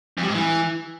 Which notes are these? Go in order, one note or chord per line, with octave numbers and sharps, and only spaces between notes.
F2
G3
G#2
E3